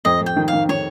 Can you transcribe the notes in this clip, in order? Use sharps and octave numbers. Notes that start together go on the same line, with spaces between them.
F2 D#5
F2
G5
D#3
F5
D#3
D#3 C#5